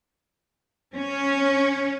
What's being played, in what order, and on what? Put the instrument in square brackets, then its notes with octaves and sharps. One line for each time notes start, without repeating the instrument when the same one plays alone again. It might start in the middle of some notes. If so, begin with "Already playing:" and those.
[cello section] C#4